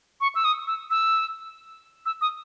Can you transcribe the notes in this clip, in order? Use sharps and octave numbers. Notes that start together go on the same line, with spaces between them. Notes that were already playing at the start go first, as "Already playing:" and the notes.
C#6
E6
D#6
E6
E6
E6
D#6